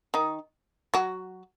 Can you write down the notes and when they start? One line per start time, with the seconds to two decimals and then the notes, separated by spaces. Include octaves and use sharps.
0.14 D#3 D#4
0.94 F#3 F#4